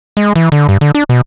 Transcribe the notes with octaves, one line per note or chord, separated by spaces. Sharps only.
G#3
E3
D3
G2
D3
D4
B2